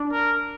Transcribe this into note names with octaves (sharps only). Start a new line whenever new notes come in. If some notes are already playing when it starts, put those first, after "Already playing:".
Already playing: D4
A#4